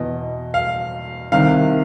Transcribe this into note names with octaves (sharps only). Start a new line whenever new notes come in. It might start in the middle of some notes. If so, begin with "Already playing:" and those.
Already playing: E2 B2 D#5
F5
C2 C3 D#3 F5